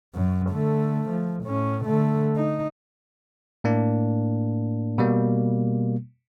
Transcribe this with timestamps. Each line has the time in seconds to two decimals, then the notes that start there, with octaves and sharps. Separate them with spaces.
0.15 F#2 F#3
0.51 D3 A3
1.09 F3
1.45 A2 C#4
1.85 D3 A3
2.36 D#4
3.64 A2 A#3 D4
4.98 B2 G3 A#3